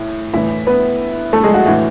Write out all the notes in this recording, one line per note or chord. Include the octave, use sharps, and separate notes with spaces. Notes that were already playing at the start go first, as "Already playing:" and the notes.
Already playing: A2 E3
A2 E3 E4 E5
B3 B4
A3 A4
G#3 G#4
F#4
A2 E3 F#4